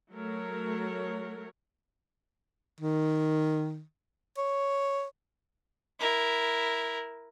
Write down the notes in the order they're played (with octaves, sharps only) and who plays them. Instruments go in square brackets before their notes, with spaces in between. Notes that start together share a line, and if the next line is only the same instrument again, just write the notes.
[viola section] F#3 A3 A#4 C#5
[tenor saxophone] D#3
C#5
[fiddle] E4 A#4